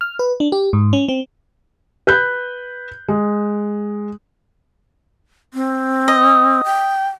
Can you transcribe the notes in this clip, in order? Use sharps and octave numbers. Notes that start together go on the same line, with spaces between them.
F6
B4
D4
G4
G#2
C#4
C4
B4 F#6 G6
G#3
C4
D#5
G5